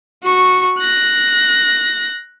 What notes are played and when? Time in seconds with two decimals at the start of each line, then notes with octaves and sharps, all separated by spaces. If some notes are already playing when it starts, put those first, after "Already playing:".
0.24 F#4 C#6
0.79 F#6 A#6